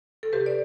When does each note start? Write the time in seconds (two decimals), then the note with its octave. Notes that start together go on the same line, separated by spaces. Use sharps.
0.23 A4
0.33 C3 G4 B4
0.46 D5